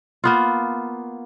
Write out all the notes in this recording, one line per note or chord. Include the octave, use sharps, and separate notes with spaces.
A#3 B3 F4